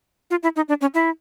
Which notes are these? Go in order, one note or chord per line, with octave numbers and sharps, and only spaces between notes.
F4
E4
D#4
D4
C#4
E4